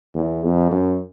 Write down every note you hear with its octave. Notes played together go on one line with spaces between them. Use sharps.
E2
F2
F#2